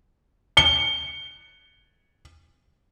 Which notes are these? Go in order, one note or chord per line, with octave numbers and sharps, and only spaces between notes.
C#7 G7